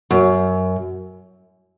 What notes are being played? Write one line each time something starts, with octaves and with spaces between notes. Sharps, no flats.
F#2